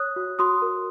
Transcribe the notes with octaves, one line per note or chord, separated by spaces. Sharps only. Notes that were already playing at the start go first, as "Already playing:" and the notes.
Already playing: C#5 D#6 F#6
F#4
F#4 C6 D#6
A#4